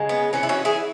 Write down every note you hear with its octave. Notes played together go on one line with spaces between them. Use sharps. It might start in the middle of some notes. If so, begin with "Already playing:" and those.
Already playing: C#3 G#3
B3
E3 B3 C#4
E4
C#4 F#4
E4 G#4